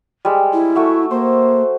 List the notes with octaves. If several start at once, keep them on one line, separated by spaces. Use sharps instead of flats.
G3 G#3
E4
A3 F#4 E5
A#3 C5